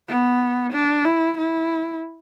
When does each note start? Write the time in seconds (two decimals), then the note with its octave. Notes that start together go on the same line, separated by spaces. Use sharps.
0.08 B3
0.73 D4
1.05 E4
1.38 E4